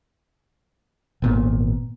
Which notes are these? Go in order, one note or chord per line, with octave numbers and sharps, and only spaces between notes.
G#1 A#2 B3